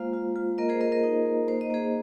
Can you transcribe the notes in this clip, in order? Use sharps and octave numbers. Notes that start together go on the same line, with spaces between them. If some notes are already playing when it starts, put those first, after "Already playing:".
Already playing: G#3 A#3 F4 C5 F5
F4
F4
A#3 A#4 D#5
G#4 C5
A#3 A#4 D#5
A#4 D#5
D#4
A#3
A#3 C5
D#5
A#3 G#4 C5